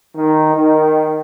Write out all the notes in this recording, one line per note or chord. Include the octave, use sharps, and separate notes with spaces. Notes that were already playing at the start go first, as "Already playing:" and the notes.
D#3
D#3